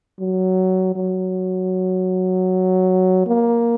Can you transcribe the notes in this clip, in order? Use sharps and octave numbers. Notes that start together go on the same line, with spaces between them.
F#3
F#3
A#3